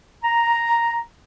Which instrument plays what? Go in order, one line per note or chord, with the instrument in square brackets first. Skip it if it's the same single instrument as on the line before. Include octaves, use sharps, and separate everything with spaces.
[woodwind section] A#5